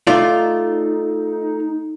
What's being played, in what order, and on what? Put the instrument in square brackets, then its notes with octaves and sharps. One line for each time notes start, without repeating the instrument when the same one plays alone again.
[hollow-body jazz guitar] A3 F4 D5 [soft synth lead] D#4